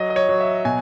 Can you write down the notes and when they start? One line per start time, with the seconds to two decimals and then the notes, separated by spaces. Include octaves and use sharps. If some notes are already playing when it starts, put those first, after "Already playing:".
Already playing: F#3 D#5
0.10 D#5
0.16 C#5
0.29 F#3
0.41 E5
0.65 B2 G#5